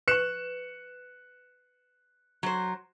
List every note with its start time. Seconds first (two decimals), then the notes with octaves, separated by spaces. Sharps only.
0.08 B4 C#6 F#6 C#7 E7
2.43 F#3 C5